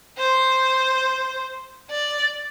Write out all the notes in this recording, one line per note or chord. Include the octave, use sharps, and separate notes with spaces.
C5
D5